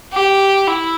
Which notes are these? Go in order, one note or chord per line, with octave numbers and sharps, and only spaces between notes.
G4
E4